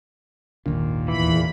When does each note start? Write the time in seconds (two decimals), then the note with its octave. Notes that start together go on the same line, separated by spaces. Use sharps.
0.66 G#1 D#2 A#2 D#3 D4
1.08 E2 E3 B5